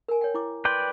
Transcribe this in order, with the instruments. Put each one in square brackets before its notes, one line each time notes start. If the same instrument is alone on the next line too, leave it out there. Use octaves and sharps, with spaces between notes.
[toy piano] A#4 G#5
C#5 G5
E4 D6
[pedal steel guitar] B4 D5 G5 [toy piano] C6